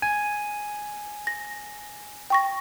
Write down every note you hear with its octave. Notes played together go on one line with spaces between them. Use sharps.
G#5
A#6
G5 C#6 A#6